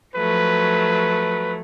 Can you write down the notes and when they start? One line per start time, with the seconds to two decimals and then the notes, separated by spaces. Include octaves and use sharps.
0.15 F3 F#3 A3 B4